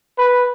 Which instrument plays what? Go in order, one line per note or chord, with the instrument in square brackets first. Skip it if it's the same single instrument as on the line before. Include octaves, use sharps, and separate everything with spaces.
[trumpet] B4